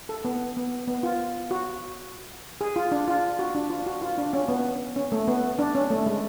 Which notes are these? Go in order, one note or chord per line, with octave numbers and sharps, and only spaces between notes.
A4
B3
B3
B3
F4
F#4
G#4
F4
D4
F4
F#4
D4
F4
F#4
F4
D4
C#4
B3
C#4
A3
B3
D4
C#4
A3
G#3